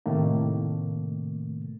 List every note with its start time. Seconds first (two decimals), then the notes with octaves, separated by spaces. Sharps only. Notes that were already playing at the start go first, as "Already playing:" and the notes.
0.06 A2 C3 D#3 A3 A#3